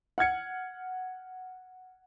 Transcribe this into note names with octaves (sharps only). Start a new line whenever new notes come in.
F#5 F6 G#6 C#7